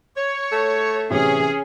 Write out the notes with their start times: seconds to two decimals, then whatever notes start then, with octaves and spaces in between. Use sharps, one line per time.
0.17 C#5
0.52 A3
1.10 A2 C3 E3 C#4 G#4